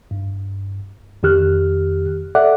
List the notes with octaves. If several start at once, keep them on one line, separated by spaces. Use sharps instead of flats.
G2
F2 D#3 G4 F6 F#6
A4 D5 E5 F#5 D6 F#6